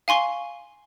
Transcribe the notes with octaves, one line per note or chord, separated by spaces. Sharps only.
F5 G#5 C6 C#6